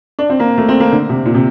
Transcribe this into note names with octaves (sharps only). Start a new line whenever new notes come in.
D4
C4
A#3
A3
C4
A#3
D3
C3
A#2
C3